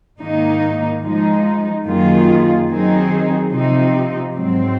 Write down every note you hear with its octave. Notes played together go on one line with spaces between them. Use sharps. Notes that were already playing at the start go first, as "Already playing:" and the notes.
G#2 D#3 A#3 D#4
F3 G#3 D#4
F#2 D#3 A#3 F4 G#4
D#3 F#3 C4 D#4 G#4
C3 F3 C4 D#4
G#2 F#3 C4